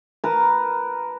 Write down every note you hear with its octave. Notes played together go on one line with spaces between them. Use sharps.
A#4 B4 A5 A#5